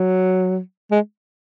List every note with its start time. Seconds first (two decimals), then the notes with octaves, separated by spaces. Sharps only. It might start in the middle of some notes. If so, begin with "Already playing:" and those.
Already playing: F#3
0.91 G#3